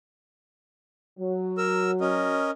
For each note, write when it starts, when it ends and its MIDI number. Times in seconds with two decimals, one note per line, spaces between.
1.19 2.41 54
1.58 1.91 70
1.58 1.91 88
2.01 2.51 61
2.01 2.51 70
2.01 2.51 75